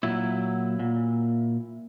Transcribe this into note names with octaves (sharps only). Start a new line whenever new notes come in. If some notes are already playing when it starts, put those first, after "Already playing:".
A#2 F#3 E4
A#2